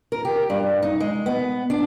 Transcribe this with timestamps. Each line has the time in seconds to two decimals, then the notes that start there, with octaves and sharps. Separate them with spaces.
0.12 A#4
0.25 G4
0.50 G2
0.82 D#4
1.00 G#3
1.26 B3
1.70 D4